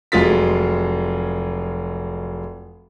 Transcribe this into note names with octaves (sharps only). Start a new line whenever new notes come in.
F1 F#3 G#3 F4 A6 B6